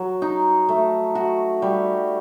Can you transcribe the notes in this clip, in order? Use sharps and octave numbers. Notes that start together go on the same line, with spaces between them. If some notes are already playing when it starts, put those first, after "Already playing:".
Already playing: F#3
D#4
A3
F#4
G3